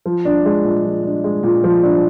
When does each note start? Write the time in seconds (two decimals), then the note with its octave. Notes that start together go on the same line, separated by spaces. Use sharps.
0.06 F3
0.25 D4
0.45 G#3
0.65 A#2
0.85 F3
1.05 D4
1.24 G#3
1.43 A#2
1.64 F3
1.83 D4